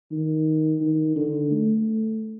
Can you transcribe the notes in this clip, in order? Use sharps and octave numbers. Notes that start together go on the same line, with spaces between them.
D#3
D#3
D3
A3